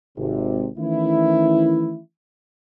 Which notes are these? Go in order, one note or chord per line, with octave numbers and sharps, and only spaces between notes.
G#1 C3
D#3 E3 A3 C#4 E4